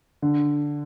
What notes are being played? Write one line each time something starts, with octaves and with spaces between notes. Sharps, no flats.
D3